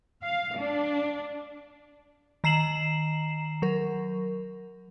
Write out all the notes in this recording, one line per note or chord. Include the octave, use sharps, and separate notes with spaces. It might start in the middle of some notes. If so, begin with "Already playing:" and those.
F5
D4
D#3 A#5 C7 E7 F#7
F#3 A#4